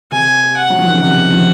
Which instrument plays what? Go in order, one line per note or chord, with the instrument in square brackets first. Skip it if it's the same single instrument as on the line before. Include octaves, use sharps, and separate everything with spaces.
[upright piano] C3 [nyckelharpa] G#5
[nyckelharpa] F#5
[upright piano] F#3
F3
D#3
C#3
[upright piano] C3 [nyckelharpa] F#5
[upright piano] F3